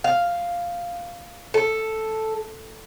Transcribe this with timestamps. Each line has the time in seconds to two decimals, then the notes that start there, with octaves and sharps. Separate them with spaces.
0.04 F5
1.54 A4